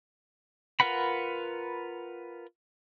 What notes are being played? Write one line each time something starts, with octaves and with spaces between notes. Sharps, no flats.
F4 A#4 B4 F#5 B5